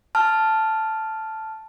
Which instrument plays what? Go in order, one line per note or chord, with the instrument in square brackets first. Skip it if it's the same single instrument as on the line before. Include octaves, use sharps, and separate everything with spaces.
[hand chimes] A5 F6